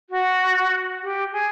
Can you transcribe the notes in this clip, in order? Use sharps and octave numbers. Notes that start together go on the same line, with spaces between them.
F#4
G4
G#4